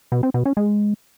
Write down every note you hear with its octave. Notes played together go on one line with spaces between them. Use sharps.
B2
C4
B2
C#4
G#3